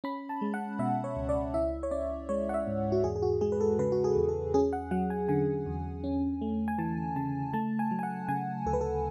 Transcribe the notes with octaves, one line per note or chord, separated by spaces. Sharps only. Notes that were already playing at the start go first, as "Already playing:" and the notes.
C#4 B5
A5
G#3
F#5
B2 E5
C#5
C#2
D5
E4 E5
C#5
C#4 D5
G#3 C#5
F#5
E5
G#2
F#4
E2 G#4
G#4
F#4
G#3 G#4
B4
A4
C#3 B4
F#4
G#4
E2
A4
C#4 G#4
F#5
F#3 F#5
G#5
D3 G#5
E2
C#4
A3
G#5
E3 A5
C#3 A5
A3 A5
G#5
F#3
G#5
F#5
C#3 G#5
D2 A4
B4
A4